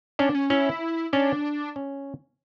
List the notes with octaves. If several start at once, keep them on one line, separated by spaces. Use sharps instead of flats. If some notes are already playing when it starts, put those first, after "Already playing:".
C#4 D4
C#4
C#4 E4
C#4 D4
C#4